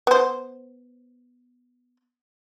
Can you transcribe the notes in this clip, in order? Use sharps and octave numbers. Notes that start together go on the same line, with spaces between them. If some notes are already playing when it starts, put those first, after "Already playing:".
B3 C5